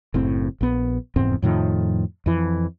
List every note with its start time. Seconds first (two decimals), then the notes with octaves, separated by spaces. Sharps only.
0.14 F#1 A2 C4
0.61 A#1 B3
1.16 F1 E2 G#2 C4
1.42 F2 A2 D#3 F3
2.26 F2 E3